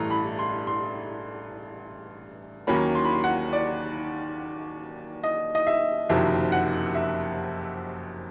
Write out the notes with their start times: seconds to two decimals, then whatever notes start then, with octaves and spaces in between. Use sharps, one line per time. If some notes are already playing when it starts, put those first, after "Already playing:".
Already playing: A1 G2 E3 A3 A#5
0.10 B5
0.39 C6
0.67 C6
2.67 D#2 D#3 F#3 A#3 C#4 B5
2.95 C6
3.04 B5
3.13 C6
3.24 F#5
3.53 D5
5.24 D#5
5.55 D#5
5.67 E5
6.09 F#1 F2 C3 D#3 F#3 E5
6.52 F#5
6.95 E5